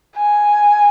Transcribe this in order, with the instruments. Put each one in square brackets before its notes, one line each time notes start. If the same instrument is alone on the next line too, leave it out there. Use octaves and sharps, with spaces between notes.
[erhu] G#5